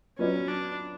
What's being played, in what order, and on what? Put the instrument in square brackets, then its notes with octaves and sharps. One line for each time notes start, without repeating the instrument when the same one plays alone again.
[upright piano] F#3 B3 F4 B4 D5 [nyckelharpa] C#4
[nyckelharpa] D4